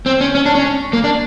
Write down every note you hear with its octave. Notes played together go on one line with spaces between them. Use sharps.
C4
C#4
C#4
D4
C#4
A#3
D4